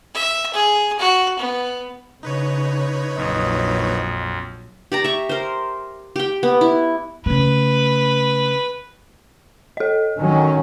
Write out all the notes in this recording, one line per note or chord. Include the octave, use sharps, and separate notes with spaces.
E5
G#4
F#4
B3
C#3 D#4 B4 C#5
A#1 F2 F#3 D#5
G4 D5 A#5
E5 C#6
A#4 C5
G4 G5
B3
E4
C#3 A3 B4
A4 D#5
D#3 F#3 C#4